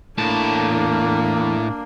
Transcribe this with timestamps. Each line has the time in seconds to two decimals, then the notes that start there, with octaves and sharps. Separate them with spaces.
0.18 E2 A2 A#3 D4 A5